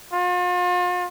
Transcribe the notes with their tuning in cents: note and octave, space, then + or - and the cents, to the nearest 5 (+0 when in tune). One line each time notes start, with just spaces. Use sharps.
F4 +40